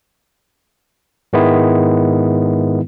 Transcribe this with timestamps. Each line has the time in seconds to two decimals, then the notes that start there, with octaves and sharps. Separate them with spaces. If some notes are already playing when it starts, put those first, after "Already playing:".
1.33 G#2 D#3 G#3 B3 E4